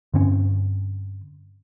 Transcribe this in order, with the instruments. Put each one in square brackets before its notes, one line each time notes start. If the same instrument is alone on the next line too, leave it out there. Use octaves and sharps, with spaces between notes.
[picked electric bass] G2 D3 C4 C#4